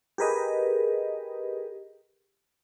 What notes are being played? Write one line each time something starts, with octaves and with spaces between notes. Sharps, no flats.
G4 G#4 A#4 B4 D#5